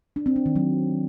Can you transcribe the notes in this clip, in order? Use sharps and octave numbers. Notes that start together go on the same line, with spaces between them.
D4
C4
D4
D#3
F#3